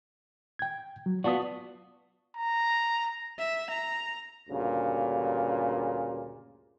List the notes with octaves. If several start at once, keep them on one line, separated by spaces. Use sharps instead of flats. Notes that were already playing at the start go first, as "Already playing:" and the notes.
G5 G#6
F#3
B3 F4 F#4 D5 A5 D#6
A#5
E5
A#5
D2 G2 A#2 C#3